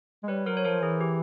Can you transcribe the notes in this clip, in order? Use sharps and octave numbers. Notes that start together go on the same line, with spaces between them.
G#3
G3 B4 C#5
F#3 A#4 C5
C#5
F3 A#4 C5
E3 G#4
G4